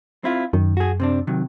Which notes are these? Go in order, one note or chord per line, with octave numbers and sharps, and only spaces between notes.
C4 E4 F4
F#2 D#3
F#4 G#4
C3 C4 D4
C3 D#3 F#3